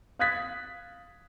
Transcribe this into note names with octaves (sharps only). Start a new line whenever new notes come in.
F5 D#6 F#6 G#6 A6 B6